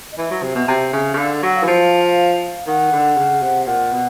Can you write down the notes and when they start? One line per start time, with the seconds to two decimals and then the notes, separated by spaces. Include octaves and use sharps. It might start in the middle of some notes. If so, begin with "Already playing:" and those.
0.12 D#5
0.18 E3 E5
0.31 F#3
0.43 C3
0.55 B2
0.68 C3
0.93 C#3
1.14 C#3
1.18 D3 F5
1.42 F#3 F#5
1.55 F5
1.63 E3
1.67 F3
2.67 D#3 F#5
2.92 D3
3.17 C#3
3.42 C3
3.67 A#2 F#5
3.92 B2